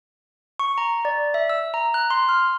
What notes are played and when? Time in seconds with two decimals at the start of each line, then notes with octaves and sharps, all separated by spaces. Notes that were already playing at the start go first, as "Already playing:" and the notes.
0.59 C#6
0.78 A#5
1.05 D5
1.34 E5
1.49 E6
1.74 A#5
1.94 F#6
2.10 C6
2.29 F6